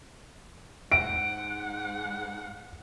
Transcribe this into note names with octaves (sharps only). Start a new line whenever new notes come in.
G#2 F#5 D7